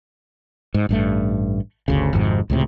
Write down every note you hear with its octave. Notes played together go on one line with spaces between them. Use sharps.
G#2
A1 G2 A3
G1 D2 C#3
G#1 F2 G#2 C3
C#2 A2 C3